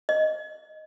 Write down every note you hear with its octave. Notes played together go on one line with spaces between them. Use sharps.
D#5